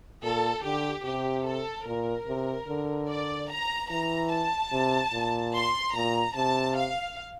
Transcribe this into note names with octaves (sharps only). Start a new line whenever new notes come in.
A#2 A4
D3 G4
C3 G4
A4
A#2 A#4
C3
D3
D5
A#5
E3 A#5
A5
C3
A#2
C6
A#2 A#5
C3 A5
F5